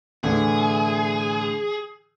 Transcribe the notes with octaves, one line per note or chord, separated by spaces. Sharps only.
A2 D3 E3 G#4